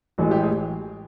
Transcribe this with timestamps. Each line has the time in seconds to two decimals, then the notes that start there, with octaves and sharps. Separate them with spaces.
0.18 A1 A2 E3 G#3 F#4
0.31 G4
0.43 G#4